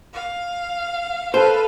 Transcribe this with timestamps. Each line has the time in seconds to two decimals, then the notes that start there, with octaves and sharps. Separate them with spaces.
0.13 F5
1.34 A4 B4 C5 F5